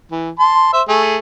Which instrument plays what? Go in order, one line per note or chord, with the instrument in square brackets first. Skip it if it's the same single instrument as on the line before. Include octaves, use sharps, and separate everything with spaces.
[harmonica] E3
A5 C6
C5 E5
A3 G#4